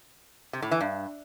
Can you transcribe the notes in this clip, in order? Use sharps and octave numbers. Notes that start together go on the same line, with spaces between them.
C3
A2
E3
G2